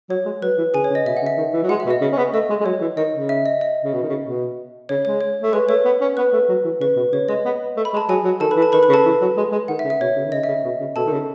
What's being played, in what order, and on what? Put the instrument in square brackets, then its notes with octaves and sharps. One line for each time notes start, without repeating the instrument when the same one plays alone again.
[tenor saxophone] F#3 [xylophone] C#5
[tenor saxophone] G#3
[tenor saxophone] F#3 [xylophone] B4
[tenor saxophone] E3
[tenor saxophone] C#3 [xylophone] G#4 G#5
[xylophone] C#5
[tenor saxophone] C#3
[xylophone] D#5
[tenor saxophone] B2 [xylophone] E5
[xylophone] F#5
[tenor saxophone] C#3
[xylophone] E5
[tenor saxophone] D#3
E3
F#3
[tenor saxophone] G#3 [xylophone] F#5
[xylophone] E5
[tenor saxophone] B2
[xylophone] D#5
[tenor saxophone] C#3
C#4
B3
[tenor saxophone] A3 [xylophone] D#5
[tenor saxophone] G#3
G#3
[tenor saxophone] F#3 [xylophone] C#5
[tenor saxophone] E3
[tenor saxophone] D#3 [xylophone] D#5
[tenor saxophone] C#3
[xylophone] E5
D#5
D#5
[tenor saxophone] C#3
B2
D#3
C#3
B2
[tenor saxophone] C#3 [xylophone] C#5
[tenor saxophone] G#3 [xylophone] C#5
[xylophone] C#5
[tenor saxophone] A3
[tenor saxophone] G#3 [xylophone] B4
[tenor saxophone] A3 [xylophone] C#5
[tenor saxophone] B3
C#4
[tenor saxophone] B3 [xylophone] B4
[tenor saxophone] A3
F#3
E3
[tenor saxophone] C#3 [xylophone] B4
[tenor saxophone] B2
[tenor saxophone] C#3 [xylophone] C#5
[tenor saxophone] G#3 [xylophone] D#5
[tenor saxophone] B3
A3
[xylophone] B5
[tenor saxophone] G#3
[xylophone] A5
[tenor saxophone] F#3 [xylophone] G#4 G#5
[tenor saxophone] F#3
[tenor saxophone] D#3 [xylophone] A4 A5
[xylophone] B4 B5
[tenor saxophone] E3
[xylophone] A4 A5
[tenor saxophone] D#3 [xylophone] B4 B5
[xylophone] B4 B5
[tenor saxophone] C#3
[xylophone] A4 A5
[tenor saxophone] E3
F#3
G#3
G#3
[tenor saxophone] D#3 [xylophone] F#5
[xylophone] E5
[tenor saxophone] C#3
[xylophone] E5
[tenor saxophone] B2 [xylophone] C#5
[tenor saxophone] C#3
D#3
[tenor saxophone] C#3 [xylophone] D#5
[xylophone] E5
[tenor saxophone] C#3
B2
C#3
[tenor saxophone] B2 [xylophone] A4 A5
[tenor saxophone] D#3
C#3